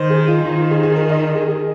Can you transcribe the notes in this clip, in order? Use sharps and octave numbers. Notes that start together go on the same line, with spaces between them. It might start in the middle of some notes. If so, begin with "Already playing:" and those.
Already playing: D#3 C5
G#4
F4
D#3 D#4
F4
G#4
G#4
A#4
D#5
A#4
G#4
G#4